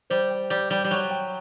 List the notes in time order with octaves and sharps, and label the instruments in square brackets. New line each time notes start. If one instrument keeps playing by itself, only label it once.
[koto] G3 [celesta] C5
[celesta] G5
[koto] G3 [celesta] C5
[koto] G3 [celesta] C5
[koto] G3
[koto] F#3 [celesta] G5
[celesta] G5